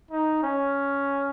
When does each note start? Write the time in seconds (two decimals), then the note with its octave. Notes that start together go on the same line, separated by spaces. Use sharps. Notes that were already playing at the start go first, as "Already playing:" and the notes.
0.11 D#4
0.43 C#4